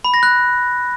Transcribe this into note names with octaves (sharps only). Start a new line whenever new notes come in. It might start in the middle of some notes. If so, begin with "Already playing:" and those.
B5
A#6
F#6